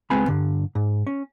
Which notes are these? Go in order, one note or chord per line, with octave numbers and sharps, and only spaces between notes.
C#2 G#3 B3 C4 G#5 B5
G2 D3
G#2
C#4